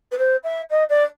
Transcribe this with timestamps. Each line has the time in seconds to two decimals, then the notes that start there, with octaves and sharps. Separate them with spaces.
0.12 B4
0.18 C5
0.43 E5
0.70 D#5
0.89 D5